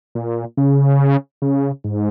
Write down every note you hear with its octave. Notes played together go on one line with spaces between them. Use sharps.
A#2
C#3
C#3
G#2